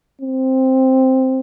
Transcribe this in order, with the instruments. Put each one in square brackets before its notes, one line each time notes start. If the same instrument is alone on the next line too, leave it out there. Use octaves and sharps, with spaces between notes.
[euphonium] C4